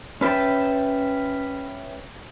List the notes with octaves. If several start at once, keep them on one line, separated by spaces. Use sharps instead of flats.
C#4 B4 E5 G5 A5